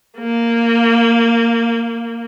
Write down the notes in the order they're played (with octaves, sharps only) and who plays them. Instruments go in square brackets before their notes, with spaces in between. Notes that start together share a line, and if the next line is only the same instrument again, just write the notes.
[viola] A#3